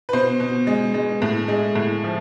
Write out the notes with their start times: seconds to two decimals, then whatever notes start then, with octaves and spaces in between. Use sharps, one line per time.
0.09 B4
0.13 B2 C5
0.40 B2
0.67 G#3
0.94 G#3
1.22 A2
1.48 G#3
1.75 A2
2.04 F3